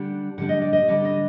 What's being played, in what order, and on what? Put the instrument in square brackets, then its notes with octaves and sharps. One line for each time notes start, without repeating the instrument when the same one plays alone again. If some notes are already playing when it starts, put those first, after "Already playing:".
Already playing: [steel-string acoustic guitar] D3 G3 D4 F#5
D3 G3 D4 F#5
D#5
D5
D#5
D3 G3 D4 F#5
D#5